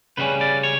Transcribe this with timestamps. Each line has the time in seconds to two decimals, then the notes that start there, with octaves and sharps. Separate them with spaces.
0.17 C#3 G3 C#4 B4
0.41 D5
0.63 C#5